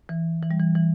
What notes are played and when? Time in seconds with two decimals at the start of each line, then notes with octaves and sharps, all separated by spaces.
0.09 E3
0.42 E3
0.51 G3
0.60 E3
0.75 E3